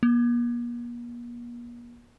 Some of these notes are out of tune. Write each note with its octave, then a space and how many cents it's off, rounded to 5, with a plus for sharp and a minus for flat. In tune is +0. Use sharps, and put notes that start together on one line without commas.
A#3 +45